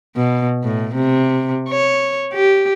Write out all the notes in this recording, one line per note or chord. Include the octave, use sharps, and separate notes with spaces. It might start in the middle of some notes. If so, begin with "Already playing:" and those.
B2
A2
C3
C#5
G4